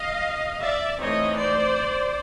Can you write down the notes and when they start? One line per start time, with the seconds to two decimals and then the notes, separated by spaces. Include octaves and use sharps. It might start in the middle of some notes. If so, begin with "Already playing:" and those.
Already playing: D#5 F5
0.61 D5 E5
0.99 E3 A3 C4 D#4 C#5 D#5
1.37 C5 D5